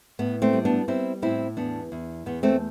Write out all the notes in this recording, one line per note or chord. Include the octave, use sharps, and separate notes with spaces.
A2 B3
A3 C4
G3
B3 D4
G3 C4 E4
A2 C4 E4
E2 B3 D4
E2
E2 B3
A3 C4